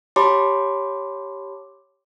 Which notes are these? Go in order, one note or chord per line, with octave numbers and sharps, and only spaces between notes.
G4 C#5 A5 B5 C6 D6